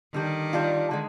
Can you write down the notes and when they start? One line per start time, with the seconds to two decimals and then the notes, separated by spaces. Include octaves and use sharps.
0.14 D3 D#3 G3 D4
0.53 G3 D4 F4
0.91 D3 G#3